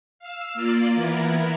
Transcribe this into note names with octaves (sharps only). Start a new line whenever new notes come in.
F5 E6
A#3 F4 D5
E3 B3 E4 A#4